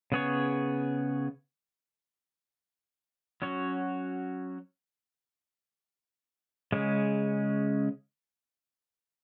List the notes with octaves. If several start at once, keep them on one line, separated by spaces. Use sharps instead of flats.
C#3 B3 G#4 C#5
F#3 C#4 F#4 C#5
C#3 G#3 C#4